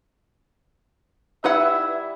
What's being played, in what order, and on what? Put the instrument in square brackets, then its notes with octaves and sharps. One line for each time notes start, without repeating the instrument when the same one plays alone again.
[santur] G3 E4 [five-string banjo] D#4 B4 F#5 [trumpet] E5